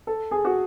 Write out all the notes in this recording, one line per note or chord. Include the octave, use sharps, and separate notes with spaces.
A4
G#4
F#4